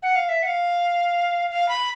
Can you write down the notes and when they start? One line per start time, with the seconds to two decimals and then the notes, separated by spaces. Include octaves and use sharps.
0.03 F#5
0.16 F5
0.29 E5
0.43 F#5
0.47 F5
1.51 F5
1.69 B5